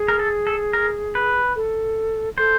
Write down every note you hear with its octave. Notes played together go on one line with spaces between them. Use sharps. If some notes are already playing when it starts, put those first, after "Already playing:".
Already playing: G#4
A#4
A4
A4
A#4
B4
A4
A4 C5